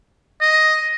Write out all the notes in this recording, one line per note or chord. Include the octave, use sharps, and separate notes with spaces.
D#5